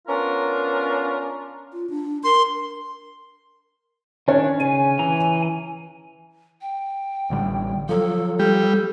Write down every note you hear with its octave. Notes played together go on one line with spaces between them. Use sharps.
B3 C#4 D4 F4 A#4
F4
D4
A#4 C6
D#3 C#4 D4 C#5
C#3 G#5
E3 A#5
G5
A1 D3 G3
F3 F#3 A4
G3 A4